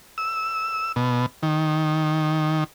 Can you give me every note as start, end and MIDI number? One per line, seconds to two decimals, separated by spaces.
0.18 0.92 88
0.96 1.26 47
1.43 2.64 51